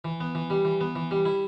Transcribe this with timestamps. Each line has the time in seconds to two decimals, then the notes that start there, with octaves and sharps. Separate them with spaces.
0.05 E3
0.20 B3
0.35 E3
0.50 G3
0.65 E3
0.81 B3
0.96 E3
1.11 G3
1.26 E4